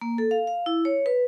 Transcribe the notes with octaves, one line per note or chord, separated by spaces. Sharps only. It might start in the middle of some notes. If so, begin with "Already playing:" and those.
A#3
A4
F5
F5
E4
C#5
B4